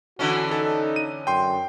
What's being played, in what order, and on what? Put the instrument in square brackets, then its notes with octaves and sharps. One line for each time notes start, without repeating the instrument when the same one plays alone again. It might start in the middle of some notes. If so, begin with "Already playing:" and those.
[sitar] D3 E3 C#4 [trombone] F#4
[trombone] D#4 [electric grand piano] A4
[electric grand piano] D#7
[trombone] F#2 [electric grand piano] G5 C6